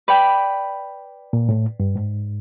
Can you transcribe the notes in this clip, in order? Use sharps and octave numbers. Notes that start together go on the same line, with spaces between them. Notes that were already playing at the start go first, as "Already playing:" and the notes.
B4 D5 G5 B5
A#2
A2
G2
G#2